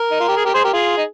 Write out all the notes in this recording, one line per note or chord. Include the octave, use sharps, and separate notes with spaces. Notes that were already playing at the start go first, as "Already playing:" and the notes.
Already playing: A#4
D#4
F4
G4
G#4
G4 A#4
G#4 C5
G4 A#4
F4 G#4
D#4